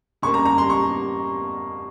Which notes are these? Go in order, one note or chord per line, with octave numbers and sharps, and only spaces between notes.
C#3 G3 A#3 C#6
A#5
A#5
C6
C#6